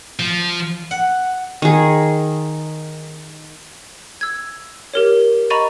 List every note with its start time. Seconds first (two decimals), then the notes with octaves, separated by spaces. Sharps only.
0.19 F3
0.91 F#5
1.62 D#3 G#4
4.21 E6 G#6
4.94 G4 A#4 C#5
5.50 D#5 A#5 B5 C#6 A6 D#7